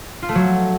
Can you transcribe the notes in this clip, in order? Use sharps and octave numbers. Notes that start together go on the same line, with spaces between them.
F4
A3
F#3